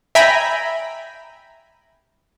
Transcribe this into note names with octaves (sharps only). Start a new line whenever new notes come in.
E5 G5 G#5 A#5 B5